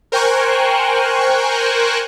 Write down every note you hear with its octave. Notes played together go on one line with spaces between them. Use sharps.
A#4 C5 G5 G#5 C#6 F#6